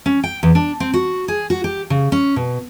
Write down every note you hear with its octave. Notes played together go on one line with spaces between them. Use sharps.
C#4
G5
E2
D4
C4
F#4
G#4
F#4
G4
C#3
C#4
B2